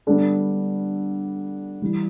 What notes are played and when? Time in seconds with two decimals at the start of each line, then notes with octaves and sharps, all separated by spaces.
0.07 D3 G3 B3 D4 A4
1.82 E3 G3